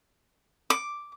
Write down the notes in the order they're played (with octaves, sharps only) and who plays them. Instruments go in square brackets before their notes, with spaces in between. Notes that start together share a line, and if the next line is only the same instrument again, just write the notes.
[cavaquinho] D6